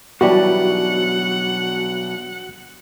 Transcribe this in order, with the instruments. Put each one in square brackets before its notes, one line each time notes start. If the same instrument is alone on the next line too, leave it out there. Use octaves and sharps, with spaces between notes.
[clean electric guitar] B2 F#3 [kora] E3 G3 D4 [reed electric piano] F#4 [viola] F#5